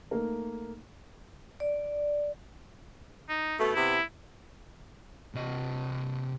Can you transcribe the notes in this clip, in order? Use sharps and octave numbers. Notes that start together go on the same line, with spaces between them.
A3 A#3 D#4 A#4
D5
D#4
B2 A3
C3 B3 E4
C3 D#5